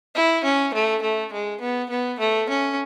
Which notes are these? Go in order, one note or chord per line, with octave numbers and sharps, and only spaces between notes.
E4
C#4
A3
A3
G#3
B3
B3
A3
C#4